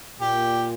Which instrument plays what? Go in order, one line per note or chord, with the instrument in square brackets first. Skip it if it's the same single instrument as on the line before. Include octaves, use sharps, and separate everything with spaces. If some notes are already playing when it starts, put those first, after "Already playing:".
[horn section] A#2 [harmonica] G4